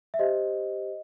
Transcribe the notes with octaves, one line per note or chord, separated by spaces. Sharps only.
E5
G4 C5 D#5